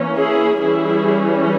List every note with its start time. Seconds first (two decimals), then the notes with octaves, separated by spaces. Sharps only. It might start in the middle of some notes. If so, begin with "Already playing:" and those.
Already playing: E3 A#3 C#4
0.19 E4 G#4
0.61 E3 G3 C#4 E4 G#4